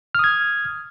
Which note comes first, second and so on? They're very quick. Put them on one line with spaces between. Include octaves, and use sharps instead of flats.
F6 D#6 G#6